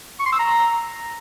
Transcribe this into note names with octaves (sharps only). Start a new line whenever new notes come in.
C#6
C6
E6
A#5